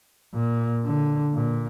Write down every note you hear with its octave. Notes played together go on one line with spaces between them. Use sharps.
A#2
D3
A#2